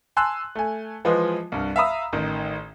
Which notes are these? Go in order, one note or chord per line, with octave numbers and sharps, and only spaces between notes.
G#5 A5 C6 E6 F#6
A3 G#5
E3 F3 G#3 F4 B4 D#5
C2 G2
E5 F5 A#5 B5 D#6 E6
A1 D#3